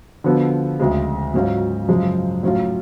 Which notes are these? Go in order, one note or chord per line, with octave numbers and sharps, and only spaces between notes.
D3 F3 B3 F#4
D2 C#3 G#3
G#2 F#3 C#4 F4
F#2 C#3 F3 G#3
A2 F#3 C#4 F4